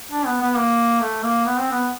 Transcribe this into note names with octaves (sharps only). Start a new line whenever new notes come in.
D4
B3
B3
A#3
A3
A#3
B3
C4
B3